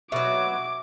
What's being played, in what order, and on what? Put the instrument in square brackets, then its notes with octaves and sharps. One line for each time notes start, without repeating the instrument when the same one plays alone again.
[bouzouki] B2 F#3 [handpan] E5 [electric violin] D6